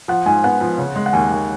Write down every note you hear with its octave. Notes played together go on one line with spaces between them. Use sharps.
F3 F#5
G#2 G#5
B3 F#5
F3
C#3
G#3
F#5
D#2 G#5
D#2